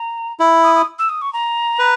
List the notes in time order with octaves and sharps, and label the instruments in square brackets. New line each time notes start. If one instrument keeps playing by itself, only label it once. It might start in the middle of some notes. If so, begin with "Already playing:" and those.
Already playing: [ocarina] A#5
[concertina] E4
[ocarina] D#6
D#6
E6
D#6
C#6
A#5
[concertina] B4